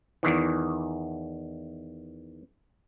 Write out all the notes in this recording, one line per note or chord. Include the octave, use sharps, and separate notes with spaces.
E2 D#3 E3